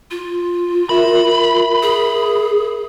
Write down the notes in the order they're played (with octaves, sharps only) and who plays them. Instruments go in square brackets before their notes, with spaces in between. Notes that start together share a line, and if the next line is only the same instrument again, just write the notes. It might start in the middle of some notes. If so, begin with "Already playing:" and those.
[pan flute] F4
[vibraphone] A#4 E5 [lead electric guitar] B5
[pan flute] G#4